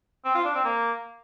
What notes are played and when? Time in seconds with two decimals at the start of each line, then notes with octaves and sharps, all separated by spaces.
0.25 C4
0.35 F4
0.45 D4
0.55 C4
0.65 A#3